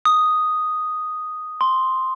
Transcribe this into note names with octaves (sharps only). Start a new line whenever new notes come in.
D#6
C6